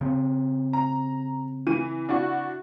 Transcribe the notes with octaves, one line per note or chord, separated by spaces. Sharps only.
C#3 C4
A#5
E3 D#7
D4 E4 F#4